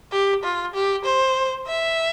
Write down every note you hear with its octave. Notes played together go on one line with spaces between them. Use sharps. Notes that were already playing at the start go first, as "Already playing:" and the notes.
G4
F4
G4
C5
E5